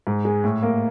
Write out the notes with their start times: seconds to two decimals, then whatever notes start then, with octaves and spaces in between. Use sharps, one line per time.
0.07 G#2
0.25 G#3
0.44 A2
0.63 A#3